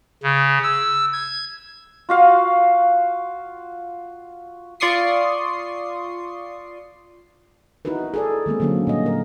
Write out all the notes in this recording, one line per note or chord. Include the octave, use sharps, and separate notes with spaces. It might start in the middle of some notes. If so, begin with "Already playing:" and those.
C#3
E6
G#6
F4 F#4 F5
F4 D5 C6 C#6 D#6 C7
D#4 E4 F#4 A#4 B4
G#4 A4 D5
D#3 G#3 A#3 C4
D3 D#3 F#3 A#3 C#4
A#2 G3 D#5
A#4